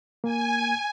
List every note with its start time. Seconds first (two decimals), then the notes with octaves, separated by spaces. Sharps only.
0.24 A#3 G#5